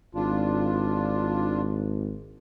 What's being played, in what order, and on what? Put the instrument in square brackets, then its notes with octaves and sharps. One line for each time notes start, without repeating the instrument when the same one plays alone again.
[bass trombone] G#1 [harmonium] D4 F4